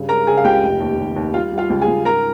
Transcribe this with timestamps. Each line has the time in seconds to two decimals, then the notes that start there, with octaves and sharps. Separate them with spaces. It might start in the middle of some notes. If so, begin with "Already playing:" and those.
Already playing: G2 C#3
0.09 G#3 A#4 A#5
0.27 C#3 G#4 G#5
0.37 F5
0.44 C#2 G4 G5
0.63 F1
0.80 D#2
0.99 D#2
1.16 D#2
1.34 G3 F4 F5
1.52 G3
1.58 F4 F5
1.70 C#2
1.82 G#4 G#5
1.88 C#2
2.05 G#2 A#4 A#5